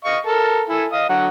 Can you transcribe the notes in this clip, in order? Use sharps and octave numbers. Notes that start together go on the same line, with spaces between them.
D#5 F5 C#6
A4 A#4 A5
E4 A4 G#5
D#5 F5 D#6
D3 F#3 F#5